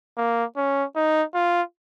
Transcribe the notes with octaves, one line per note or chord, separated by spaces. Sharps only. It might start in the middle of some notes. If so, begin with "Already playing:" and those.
A#3
C#4
D#4
F4